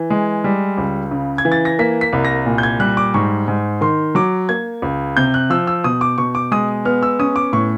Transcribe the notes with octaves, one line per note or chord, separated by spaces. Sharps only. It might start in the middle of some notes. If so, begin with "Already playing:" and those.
Already playing: E3
G#3
G3
C#2
C#3
G#6
E3
A6
A#6
A#3 B6
B6
C2
A#6
A#2
G6
G#6
G3 F#6
D6
G#2 C#6
G#2
D#3 C6
F#3 D6
A#3 G#6
C#2
C3 G6
F#6
F3 E6
E6
B2 D#6
D6
B2 C#6
D6
G#3 D#6
B3 F6
E6
C#4 D#6
D6
A2 C#6